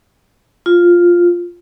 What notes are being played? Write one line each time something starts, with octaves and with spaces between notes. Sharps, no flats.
F4